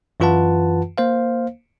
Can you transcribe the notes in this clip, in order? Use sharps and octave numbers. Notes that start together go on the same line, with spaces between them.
F#2 E3 F4 B4 F#5 A5
A#3 C5 F5